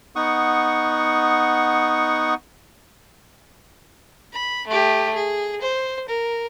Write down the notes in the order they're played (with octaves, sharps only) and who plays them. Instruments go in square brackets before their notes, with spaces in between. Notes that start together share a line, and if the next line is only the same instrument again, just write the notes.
[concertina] B3 D#4 F#5 C#6 D#6
[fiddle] B5
A3 G4
G#4
C5
A#4